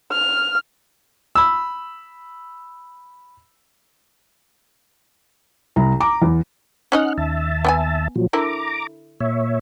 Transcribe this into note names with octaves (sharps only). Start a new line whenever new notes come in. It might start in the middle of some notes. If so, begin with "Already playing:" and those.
F6
B5 E6
C2 A#5
A#5 D6
E2
C#4 D#4 D#5 F#5 F6 F#6
D#2 E5 A5
B3 G5 G#5
A#2 F3 F#3
D3 E4 A#4 A#5 D6
A#2 C#5 E5